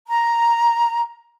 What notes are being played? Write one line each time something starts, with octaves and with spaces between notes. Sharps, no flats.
A#5